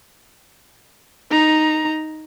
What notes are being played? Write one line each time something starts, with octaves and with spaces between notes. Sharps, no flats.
D#4 A#5